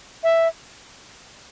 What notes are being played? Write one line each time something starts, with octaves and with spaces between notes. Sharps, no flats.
E5